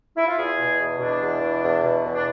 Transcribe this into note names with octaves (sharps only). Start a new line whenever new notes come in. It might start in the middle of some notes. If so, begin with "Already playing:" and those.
E4
F4
E2 G#4
B2
E2
B2 D4
E2
B2
E2
B2
E2
D4